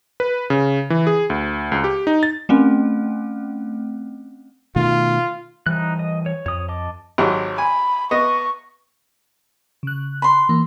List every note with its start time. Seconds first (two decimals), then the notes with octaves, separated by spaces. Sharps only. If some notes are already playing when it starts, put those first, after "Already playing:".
0.20 B4
0.50 C#3
0.90 E3
1.07 G#4
1.30 D2
1.72 C#2
1.84 G4
2.07 D#4
2.23 A6
2.49 A3 C4 C#4
4.76 B2 D#3 A3 F4
5.66 E3 G3 D#4 F#6
5.99 D#5
6.26 C#5
6.46 F2 C#5 D#6
6.68 D#5 A5 D6
7.18 G#1 F#3 G4
7.58 G#5 B5
8.11 B3 D#5 C#6
9.83 C#3 F#6
10.22 B5 C6
10.49 E3 A#3